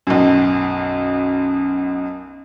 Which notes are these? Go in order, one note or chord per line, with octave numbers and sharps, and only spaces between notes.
B1 F#2